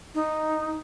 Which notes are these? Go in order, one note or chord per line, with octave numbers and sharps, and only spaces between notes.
D#4